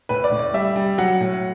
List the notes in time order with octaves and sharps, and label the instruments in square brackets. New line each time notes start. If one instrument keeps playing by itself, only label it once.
[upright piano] A2 B4
D5
A2
D5
G3 E5
G3
F#3 F#5
A2